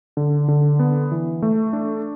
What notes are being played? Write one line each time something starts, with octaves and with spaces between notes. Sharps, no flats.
D3
D3
B3
E3
A3
D4